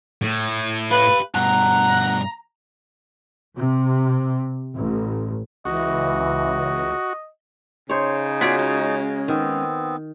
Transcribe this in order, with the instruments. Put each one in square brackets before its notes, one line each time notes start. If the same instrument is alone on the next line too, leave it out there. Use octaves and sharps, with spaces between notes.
[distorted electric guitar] A2
[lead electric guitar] G4 F5 [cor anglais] B4
[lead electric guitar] G2 B2 [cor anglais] F#5 [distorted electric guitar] A#5
[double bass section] C3
A1
[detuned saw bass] C#2 [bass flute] E3 [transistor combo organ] F#4 [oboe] D#5
[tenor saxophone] C#3 [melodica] D#4 [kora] C5 C#5
[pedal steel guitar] B3 G#4 D5 [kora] F4 F#4
[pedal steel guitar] G#3 C#4
[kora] D#3 [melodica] B3 C4